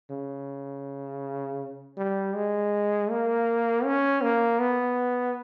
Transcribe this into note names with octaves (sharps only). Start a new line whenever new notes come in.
C#3
G3
G#3
A#3
C#4
A#3
B3